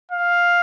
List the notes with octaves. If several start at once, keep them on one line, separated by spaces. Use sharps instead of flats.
F5